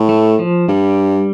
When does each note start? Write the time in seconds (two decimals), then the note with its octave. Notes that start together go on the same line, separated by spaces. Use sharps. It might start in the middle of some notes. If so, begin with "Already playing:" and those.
Already playing: A2
0.09 A3
0.39 F3
0.68 G2 G3